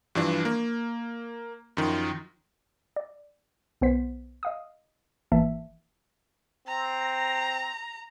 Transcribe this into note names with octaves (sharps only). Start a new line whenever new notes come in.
G2 E3 F3 D4
A#3
F#2 D#3 F3
D5
B1 B3 C5 B6
D#5 F5 D#6
G#1 E3 A#3 E5 A5
C4 A#5